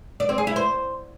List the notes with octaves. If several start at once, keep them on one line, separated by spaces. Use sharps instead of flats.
D5
C4
G#4
E4
C5